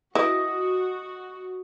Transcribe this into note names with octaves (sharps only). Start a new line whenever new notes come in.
E4 F#4 B4 D#5 G5